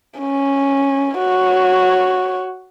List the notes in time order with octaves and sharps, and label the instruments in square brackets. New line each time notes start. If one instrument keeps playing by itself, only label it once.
[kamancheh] C#4
F#4 C#5